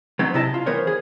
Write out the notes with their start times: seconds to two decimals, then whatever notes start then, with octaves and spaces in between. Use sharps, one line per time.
0.19 F#3 B3 C4 D#4
0.34 C3 E4 D#5 A5
0.54 F4
0.66 E3 G3 B3 A#4 C5 C#5
0.87 G#4